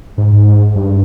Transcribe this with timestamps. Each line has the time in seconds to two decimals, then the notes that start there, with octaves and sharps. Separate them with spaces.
0.18 G#2
0.33 G#2
0.75 G2